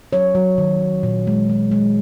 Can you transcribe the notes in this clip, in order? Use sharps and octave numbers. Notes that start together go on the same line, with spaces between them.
F#3 C#5
F#3
D#3
D#3
A#2
G#3
G#3
G#3